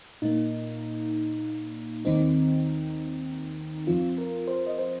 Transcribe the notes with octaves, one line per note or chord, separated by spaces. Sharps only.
A#2 A#3 D#4
D#2 D#3 C4 D#4
F2 F3 C4 F4
A#4
C5
D#5
C5